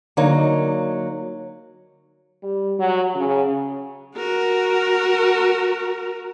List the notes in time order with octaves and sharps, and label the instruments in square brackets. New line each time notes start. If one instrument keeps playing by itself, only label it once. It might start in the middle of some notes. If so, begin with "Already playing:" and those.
[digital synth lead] D3 [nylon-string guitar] F#3 A#3 D#4
[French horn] G3
F#3
C#3
[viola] F#4 A#4